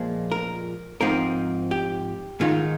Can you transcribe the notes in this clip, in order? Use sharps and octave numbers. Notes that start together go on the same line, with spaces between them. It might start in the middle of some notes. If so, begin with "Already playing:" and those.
Already playing: A#2 F3 G#3
A#4
G#2 F3 C4 D#4 A#4
G4
G#2 D#3 G#3 D#4 F4